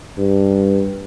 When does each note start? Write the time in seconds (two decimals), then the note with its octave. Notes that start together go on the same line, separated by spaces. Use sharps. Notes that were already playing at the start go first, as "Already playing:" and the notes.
0.18 G2